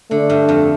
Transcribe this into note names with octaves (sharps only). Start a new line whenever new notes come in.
D3 A3
G2
F2